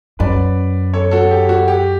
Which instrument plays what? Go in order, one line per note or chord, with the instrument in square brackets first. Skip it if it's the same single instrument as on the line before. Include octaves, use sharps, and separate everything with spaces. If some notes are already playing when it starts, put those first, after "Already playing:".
[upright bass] F#2 [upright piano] B4 D5
[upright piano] A4 C#5
F#4 A4
G4
F#4
G4